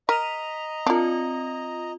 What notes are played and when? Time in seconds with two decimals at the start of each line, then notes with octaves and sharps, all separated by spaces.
0.09 A#4 D#5 A#5 B6 D#7 F7
0.86 C4 D4 F4 A#4